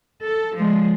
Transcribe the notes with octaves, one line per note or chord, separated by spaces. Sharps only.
A4
F3 G#3